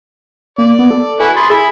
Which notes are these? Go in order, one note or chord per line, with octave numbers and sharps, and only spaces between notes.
A#3 D5
B3
A4
E4 F#4 B4 G#5
G#4 B5 C6 A6
G#4 E5 B5